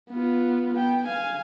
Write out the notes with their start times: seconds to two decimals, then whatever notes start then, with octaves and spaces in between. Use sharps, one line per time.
0.11 B3 F4
0.74 B3 G5
1.06 F5 G#5